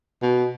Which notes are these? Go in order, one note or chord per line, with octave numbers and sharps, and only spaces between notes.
B2